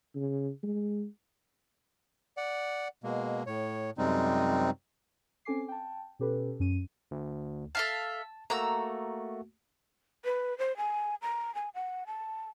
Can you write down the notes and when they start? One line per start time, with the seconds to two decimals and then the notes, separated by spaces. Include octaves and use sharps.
0.15 C#3
0.63 G#3
2.37 D5 F#5
3.04 B2 G#3 A#3
3.47 A2 C#5
3.98 F#2 C3 G3 G#3 C4 D#4
5.45 C4 C#4 A4 G#5 D6 C7
5.68 G5 A5
6.19 B2 C#4 G4 A4 B4
6.60 F#2 C#4 D#7
7.11 D2
7.75 A4 E5 F5 A5
8.50 A3 A#3 F#4 A#5 E6
10.25 B4
10.58 C5
10.77 G#5
11.22 A#5
11.55 G#5
11.74 F#5
12.07 A5